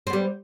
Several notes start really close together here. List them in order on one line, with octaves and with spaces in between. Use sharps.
C4 B3 G3